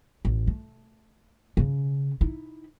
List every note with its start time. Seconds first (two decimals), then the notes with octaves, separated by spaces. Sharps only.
0.25 A1
0.47 A3
1.57 C#3 C#4
2.21 D#4 E4